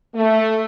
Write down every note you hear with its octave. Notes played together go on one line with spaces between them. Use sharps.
A3